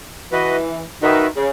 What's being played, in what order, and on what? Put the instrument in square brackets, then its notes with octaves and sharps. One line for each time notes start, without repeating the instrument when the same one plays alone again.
[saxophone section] E3 [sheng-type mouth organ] F#4 B4 D#5
[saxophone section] D#3 [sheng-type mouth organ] D#4 F#4 B4 E5
[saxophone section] C#3